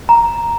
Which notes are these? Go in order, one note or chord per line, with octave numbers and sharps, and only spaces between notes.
A#5